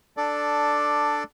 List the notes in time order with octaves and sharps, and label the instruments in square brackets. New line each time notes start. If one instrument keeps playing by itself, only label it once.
[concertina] D4 A4 D5